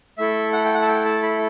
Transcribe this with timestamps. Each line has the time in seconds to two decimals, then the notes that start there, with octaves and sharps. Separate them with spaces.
0.18 A3 E4 A4 E5
0.53 F#5
0.65 G5
0.74 F#5
0.82 A5
0.88 G5
1.05 A5
1.23 B5